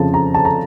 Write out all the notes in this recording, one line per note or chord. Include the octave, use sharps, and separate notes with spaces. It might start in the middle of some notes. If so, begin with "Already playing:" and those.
Already playing: F2 C#3 F3 A5
A#5
A5
A#5